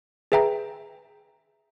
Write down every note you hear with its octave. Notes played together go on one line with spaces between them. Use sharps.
G#4 B4 E5 G5 A#5